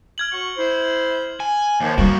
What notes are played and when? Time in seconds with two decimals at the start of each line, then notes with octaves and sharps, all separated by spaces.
0.18 F6 G#6 F#7
0.32 F#4 C#6
0.57 E4 C5
1.40 G#5
1.80 D#2 D#3 F3
1.98 G3 A#3 F#4